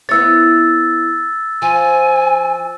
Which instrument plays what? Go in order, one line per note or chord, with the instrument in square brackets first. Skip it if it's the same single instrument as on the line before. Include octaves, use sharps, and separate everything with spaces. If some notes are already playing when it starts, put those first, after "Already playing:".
[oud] B3 E4 C#5 [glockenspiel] E6 A6
[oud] F3 [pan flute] G#5